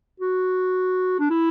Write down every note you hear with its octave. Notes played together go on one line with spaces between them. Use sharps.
F#4
D4
E4